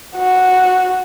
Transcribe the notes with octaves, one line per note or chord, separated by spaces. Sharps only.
F#4